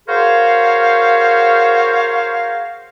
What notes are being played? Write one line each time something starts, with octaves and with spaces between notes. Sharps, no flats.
F#4 G#4 A#4 C5 C#5 F5